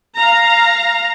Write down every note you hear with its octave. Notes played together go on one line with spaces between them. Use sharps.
F5 A#5